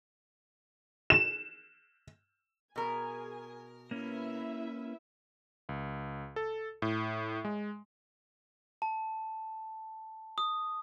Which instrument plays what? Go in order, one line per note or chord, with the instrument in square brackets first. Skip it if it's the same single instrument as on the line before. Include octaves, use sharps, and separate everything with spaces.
[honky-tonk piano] E7
[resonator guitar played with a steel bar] B2 A#4 [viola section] G#4 G#5
[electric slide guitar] A#3 C#4 [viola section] E4 B4 E5
[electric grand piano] C#2
A4
A2
G#3
[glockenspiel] A5
D#6